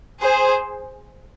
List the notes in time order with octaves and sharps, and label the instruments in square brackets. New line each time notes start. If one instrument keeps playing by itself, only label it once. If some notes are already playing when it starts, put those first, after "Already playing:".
[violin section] G#4 C5